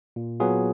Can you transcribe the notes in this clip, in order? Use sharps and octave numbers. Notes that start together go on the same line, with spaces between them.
A#2
F#3 B3 F4 G#4